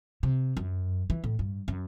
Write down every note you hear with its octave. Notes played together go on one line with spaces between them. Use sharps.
C3
F#2
E3
A2
G2
F#2